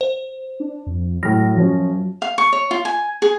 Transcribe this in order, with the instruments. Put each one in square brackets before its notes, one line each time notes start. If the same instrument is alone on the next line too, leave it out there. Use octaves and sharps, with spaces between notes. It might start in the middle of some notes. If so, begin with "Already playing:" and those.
[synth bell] C5
[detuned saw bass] D4
F2
[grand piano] A2 F6 [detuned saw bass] F#3 [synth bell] A#6
[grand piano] F#2 F3 C#4
[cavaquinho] F5
C#6
C#5
F4
G#5
G#4